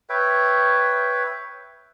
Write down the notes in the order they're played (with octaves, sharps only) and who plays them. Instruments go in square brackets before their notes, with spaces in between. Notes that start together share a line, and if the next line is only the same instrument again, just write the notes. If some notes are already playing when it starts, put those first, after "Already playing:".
[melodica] B4 C#5 E5 G5